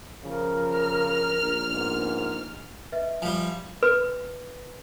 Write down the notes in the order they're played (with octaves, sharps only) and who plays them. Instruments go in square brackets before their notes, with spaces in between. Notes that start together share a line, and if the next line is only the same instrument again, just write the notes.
[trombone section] C#3 F3 [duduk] A#4
[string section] F6
[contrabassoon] A#1
[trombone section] G#2 A#3 B3
[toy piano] B4 D#5 E5
[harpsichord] F3 G3 [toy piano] F5 G#5
[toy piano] B4